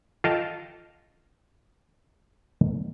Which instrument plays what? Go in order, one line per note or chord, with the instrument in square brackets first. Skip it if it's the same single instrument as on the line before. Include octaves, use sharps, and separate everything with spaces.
[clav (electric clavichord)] F4 A4 D#5 F5 G5 A5